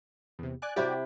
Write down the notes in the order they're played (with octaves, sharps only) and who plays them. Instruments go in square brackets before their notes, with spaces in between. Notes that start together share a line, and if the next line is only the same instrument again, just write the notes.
[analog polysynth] E2 C3
D5 G#5 F#6
[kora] C3 E4 G5 [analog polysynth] F#4 G4 D5